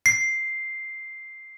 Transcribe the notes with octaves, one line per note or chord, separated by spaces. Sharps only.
C7